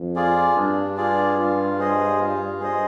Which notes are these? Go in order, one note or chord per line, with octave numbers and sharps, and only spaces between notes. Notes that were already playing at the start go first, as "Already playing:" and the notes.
Already playing: F2
F4 G#4 D5
G2 D4
F4 G#4 D5
F4
G#4 C5 D#5
F4
G#4 C5 D#5